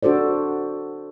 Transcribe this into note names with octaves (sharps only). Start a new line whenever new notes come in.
D4 F#4 A4 C5 D5